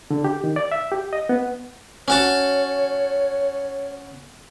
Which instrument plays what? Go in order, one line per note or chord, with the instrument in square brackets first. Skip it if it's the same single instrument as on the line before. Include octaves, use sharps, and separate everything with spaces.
[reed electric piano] D3
G4
D#3
D5
E5
G4
D#5
B3
[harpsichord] C#4 F#4 A5 [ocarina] C#5